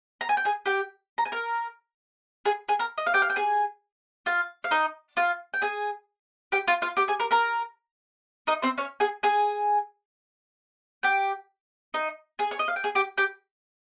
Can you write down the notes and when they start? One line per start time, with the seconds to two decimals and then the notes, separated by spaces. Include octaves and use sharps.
0.21 A#5
0.29 G#5
0.37 G5
0.45 G#4 G#5
0.66 G4 G5
1.18 A#5
1.25 G#5
1.32 A#4 A#5
2.46 G#4 G#5
2.69 G#4 G#5
2.79 A#4 A#5
2.98 D#5
3.06 F5
3.14 G4 G5
3.22 F5
3.30 G5
3.36 G#4 G#5
4.26 F4 F5
4.64 F5
4.71 D#4 D#5
5.17 F4 F5
5.54 G5
5.62 G#4 G#5
6.52 G4 G5
6.68 F4 F5
6.82 F4 F5
6.97 G4 G5
7.08 G#4 G#5
7.20 A#4 A#5
7.31 A#4 A#5
8.47 D#4 D#5
8.62 C4 C5
8.78 C#4 C#5
9.00 G#4 G#5
9.23 G#4 G#5
11.03 G4 G5
11.94 D#4 D#5
12.39 G#4 G#5
12.51 C#5
12.59 D#5
12.68 F5
12.76 G5
12.84 G#4 G#5
12.95 G4 G5
13.18 G4 G5